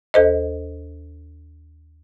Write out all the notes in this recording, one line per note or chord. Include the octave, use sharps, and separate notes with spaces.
D#2 A4 C5 D#5